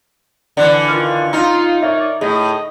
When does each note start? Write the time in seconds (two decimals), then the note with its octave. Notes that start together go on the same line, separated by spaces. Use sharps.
0.57 D3 E3 D5 F#6
0.88 D#3 F4 F6
1.33 D#4 F4
1.83 A#4 C#5 D5 E5
2.21 A2 G#4 D#5